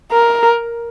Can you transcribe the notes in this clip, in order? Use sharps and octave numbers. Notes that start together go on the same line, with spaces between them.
A#4